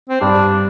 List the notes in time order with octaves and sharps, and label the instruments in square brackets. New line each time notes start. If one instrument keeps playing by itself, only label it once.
[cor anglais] C4
[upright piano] G2 [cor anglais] D4